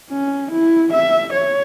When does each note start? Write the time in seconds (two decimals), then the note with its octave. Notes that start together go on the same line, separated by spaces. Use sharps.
0.10 C#4
0.51 E4
0.93 E5
1.33 C#5